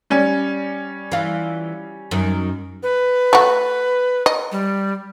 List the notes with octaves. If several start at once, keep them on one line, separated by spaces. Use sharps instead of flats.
G3 C#4
E3 F4
F#2 D#3
B4
A3 F#4
D#5
G3